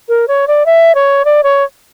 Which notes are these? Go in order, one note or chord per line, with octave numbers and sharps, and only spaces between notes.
A#4
C#5
D5
E5
C#5
D5
C#5